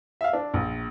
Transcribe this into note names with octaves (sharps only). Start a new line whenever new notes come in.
E5 F5
D4
A#1